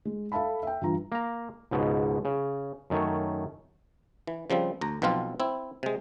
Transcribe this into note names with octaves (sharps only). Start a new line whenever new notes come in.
G#3
A4 E5 F5 A5 B5
E5 G5
G2 E3 F4 A#5
A#3 A#5
C#2 G#2 B2
C#3
F#2 D#3 A3 C#5
E3
C#3 F3 G3 C4
D2 A#5
B1 B2 F3 C4 F4
C4 E4
C3 G#3